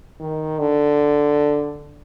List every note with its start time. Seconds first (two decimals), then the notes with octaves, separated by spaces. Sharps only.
0.20 D#3
0.59 D3